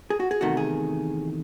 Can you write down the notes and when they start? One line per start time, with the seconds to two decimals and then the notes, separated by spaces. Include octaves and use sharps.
0.10 G#4
0.20 F#4
0.31 G#4
0.41 E2 C3 D#3 A3 F#4
0.57 G#4